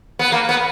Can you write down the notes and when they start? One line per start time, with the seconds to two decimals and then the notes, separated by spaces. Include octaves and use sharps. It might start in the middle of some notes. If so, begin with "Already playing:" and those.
0.19 B3
0.32 A#3
0.49 B3